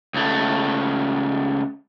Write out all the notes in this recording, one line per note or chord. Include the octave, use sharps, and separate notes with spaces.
C#2 A3